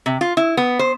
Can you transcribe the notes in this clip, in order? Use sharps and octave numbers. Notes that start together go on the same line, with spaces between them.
C3
F4
E4
B3
C5